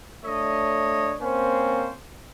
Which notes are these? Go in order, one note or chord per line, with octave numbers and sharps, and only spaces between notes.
A3 D4 C#5 D#5
A#3 C4 C#4 C5